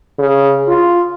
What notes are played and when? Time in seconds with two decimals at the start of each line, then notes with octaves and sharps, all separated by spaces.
0.19 C#3
0.68 F4